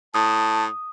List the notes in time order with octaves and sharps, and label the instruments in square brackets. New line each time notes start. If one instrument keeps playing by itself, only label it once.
[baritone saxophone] A2 [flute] A5 [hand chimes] D#6